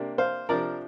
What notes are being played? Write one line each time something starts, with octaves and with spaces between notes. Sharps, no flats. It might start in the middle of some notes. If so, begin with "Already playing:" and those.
Already playing: C3 A#3 D4
C5 F5
C3 F3 D4 A#4 D5